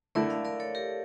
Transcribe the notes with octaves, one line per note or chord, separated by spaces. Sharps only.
D3 A3 E4 A#4 D5
D5 F5
A#4 D5
A4 C#5
G4 A#4